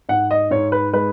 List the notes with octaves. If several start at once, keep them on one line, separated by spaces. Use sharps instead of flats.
G#2 F#5
D#5
G#2 C#5
B4
G#3 B4